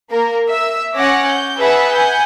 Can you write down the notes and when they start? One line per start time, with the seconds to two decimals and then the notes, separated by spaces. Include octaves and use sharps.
0.11 A#3 A#4
0.49 E5 E6
0.96 C#4 C#5 F#5 G#5 D6 A#6
1.26 G6
1.58 G#4 B4 E5 F#5 A5
1.90 F#5 G#5 G6